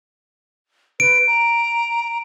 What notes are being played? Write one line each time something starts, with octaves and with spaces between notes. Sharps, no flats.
B4 D7
A#5